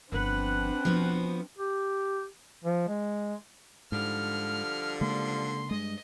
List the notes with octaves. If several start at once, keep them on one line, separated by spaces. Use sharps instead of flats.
G1 F3 C4 D4 B4 F#5
E1 F3 B3 F#4
G4
F3
G#3
G#2 D3 F3 G3 F6
C#3 G#3 A#3 C6
G2 G#3 D#5